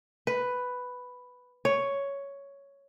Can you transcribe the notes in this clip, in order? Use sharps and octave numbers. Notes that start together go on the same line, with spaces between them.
B4
C#5